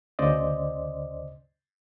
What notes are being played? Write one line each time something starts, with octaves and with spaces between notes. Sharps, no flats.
D2 C#3 C5 D5 D#5